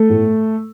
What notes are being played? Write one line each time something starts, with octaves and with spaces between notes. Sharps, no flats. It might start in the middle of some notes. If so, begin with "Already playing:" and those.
Already playing: A3 A4
A2